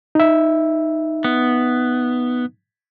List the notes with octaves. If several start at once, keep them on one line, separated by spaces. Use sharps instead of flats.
D#4 E5
B3